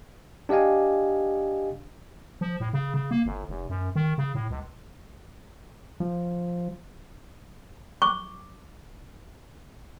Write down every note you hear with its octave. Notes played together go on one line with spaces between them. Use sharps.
D4 G4 D#5 F5 G#5
F3
A2
C#3
C#3
A#3
G1
F1
F#2
D#3
C#3
A2
C#2
F3
C#6 D6